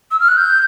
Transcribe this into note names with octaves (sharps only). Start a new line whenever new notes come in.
E6
F6
F#6
G6